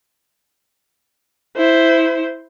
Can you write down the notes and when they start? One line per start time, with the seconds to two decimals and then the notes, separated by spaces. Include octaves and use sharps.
1.57 E4 C5